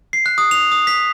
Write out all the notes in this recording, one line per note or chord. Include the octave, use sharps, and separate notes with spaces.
C7
F#6
D#6
F7
D#6
B6